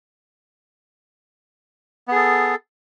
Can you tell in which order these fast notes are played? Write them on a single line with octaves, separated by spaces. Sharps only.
B3 G#4 A4